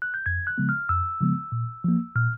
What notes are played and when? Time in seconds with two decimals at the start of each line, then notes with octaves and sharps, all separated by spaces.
0.02 F#6
0.14 G6
0.26 F2 G#6
0.47 F#6
0.58 C#3 F3 G#3 B3
0.69 F6
0.89 F2 E6
1.21 C#3 F3 G#3 B3
1.52 A#2
1.84 F3 A#3
2.15 A#2 F6